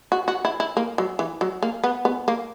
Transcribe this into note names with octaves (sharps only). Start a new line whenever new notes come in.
F#4
F#4
E4
E4
A#3
F#3
E3
F#3
A#3
B3
B3
A#3